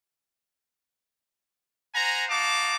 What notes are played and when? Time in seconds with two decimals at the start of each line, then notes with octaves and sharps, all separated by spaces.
1.94 C5 F#5 G#5 A#5
2.29 D#4 F#4 F5 A5 D6